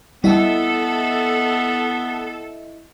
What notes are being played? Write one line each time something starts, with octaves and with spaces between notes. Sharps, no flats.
G3 B3 E4 A4 D#5 E5